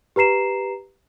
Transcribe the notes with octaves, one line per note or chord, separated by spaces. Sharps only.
G4 B4 A#5 C7 E7